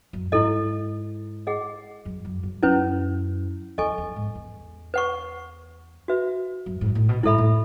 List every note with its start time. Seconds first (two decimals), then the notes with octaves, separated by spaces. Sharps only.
0.13 F#2
0.32 G#2 E4 A4 D#5
1.47 G#4 D#5 F#5
2.05 F#2
2.25 F#2
2.43 F#2
2.62 F#2 C#4 E4 B4
3.78 E2 A4 D#5 G#5 C#6
3.98 E2
4.16 G#2
4.35 E2
4.94 B4 F#5 C#6
6.08 F#4 B4 E5
6.66 F#2
6.81 G#2
6.95 A2
7.09 B2
7.23 G#2 E4 A4 E5 B5
7.38 A2